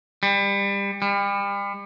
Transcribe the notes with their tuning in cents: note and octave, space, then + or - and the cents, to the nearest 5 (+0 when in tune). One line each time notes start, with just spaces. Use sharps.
G3 +25
G3 +35